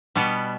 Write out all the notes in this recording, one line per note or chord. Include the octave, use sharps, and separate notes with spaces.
B2 G3 B3